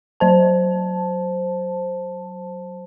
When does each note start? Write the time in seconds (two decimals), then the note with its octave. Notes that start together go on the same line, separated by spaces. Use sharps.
0.20 F#3 C5 A5